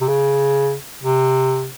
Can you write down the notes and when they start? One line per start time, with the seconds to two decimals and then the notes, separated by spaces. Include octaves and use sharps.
0.01 C3
0.08 C#3
1.03 C3